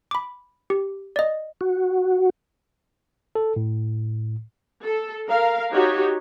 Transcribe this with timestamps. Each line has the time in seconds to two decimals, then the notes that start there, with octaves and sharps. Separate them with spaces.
0.11 B5 D6
0.70 G4
1.16 D5 D#5
1.61 F#4
3.35 A4
3.56 A2
4.84 A4
5.27 A#4 F5
5.71 D#4 F#4 G4 C#5